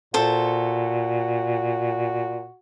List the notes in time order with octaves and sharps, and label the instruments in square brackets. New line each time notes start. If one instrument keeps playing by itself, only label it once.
[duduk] A#2 [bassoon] F#4 [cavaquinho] A4 C5